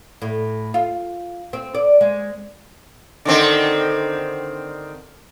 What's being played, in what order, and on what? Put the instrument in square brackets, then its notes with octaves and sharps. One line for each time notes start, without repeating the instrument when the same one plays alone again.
[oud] A2
F4
C4
D5
G#3
[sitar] D3 D#3 C4